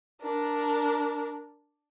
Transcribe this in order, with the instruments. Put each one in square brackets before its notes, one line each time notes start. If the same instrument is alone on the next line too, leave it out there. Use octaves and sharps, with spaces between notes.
[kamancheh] D4 A#4